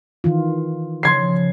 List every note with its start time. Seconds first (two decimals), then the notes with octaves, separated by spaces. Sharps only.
0.24 D#3 E3 F4
1.03 C#3 F3 C6 G#6 C7